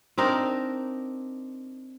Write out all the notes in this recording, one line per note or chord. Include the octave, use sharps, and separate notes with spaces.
C4 D4 D#4 A#4